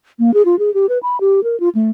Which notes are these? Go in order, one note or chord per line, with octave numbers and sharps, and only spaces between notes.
A#3
G#4
F4
G#4
G4
B4
B5
G4
A#4
F4
A3